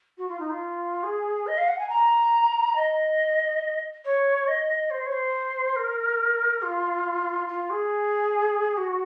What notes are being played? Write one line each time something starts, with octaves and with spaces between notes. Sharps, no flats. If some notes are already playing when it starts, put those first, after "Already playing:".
F#4
F4
D#4
F4
G#4
D#5
F5
F#5
G#5
A#5
D#5
C#5
D#5
C5
C#5
C5
A#4
F4
F4
G#4
F#4